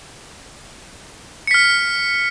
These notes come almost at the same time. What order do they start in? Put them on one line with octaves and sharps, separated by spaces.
C#7 B6 F6